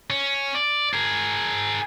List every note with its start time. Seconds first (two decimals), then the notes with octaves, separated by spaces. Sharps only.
0.10 C#4
0.55 D5
0.93 G#4 A#4